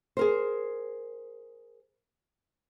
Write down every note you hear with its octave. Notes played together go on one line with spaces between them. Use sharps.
G#4 A#4 C5